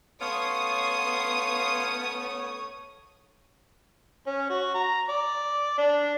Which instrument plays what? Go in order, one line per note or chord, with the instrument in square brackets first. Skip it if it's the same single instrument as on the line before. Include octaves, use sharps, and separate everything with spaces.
[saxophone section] A3 C#4 C#5 [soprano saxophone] B3 [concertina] F5 C6 [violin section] D#6
[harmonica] C#4
F#4
A#5
D5
D4